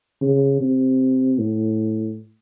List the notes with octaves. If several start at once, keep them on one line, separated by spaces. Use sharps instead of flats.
C#3
C3
A2